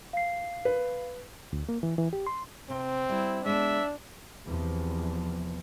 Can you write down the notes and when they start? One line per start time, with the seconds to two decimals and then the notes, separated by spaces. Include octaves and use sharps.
0.13 F5 C7
0.65 B4
1.53 D2
1.69 A#3
1.83 E3
1.98 E3
2.13 G4
2.27 C6
2.70 C3 C4
3.09 G3 E4
3.46 G#3 B3 D4 E5
4.45 E2 C3 F3